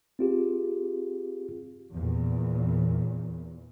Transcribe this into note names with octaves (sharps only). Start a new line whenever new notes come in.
C4 F4 G4 G#4
E2 A#2